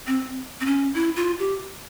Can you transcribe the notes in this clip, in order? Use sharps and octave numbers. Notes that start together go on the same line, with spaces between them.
C4
C4
C#4
E4
F4
G4